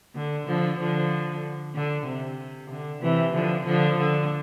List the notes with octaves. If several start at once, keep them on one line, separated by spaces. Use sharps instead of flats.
D3
D3 F3
D3 F3
D3
C3
D3
C3 E3
D3 F3
D3 F3
D3